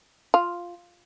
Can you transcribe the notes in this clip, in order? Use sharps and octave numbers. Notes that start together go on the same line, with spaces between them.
F4